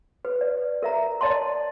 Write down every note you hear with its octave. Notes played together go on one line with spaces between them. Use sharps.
B4
D5
A#4 E5 A#5
D5 D#5 A5 C6